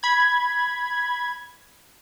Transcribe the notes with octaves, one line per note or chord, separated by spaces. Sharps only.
B5 G#6